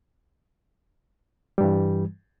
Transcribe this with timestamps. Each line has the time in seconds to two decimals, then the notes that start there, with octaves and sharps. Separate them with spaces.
1.58 G3
1.61 G2
1.63 E3